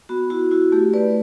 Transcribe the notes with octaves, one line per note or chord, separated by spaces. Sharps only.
B3 F#4
E4 F#4
E4 F#4
A3 G4
A3 B4 D5